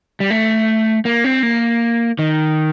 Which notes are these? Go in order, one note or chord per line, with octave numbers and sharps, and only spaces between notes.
G3
A3
A#3
C4
A#3
D#3